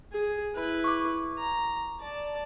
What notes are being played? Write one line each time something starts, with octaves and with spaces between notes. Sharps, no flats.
G#4
E4 B4
C#6 D6
A#5
D5 A5